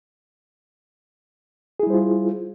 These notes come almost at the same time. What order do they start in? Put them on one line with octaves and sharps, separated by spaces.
G#4 E4 G3 C5 F4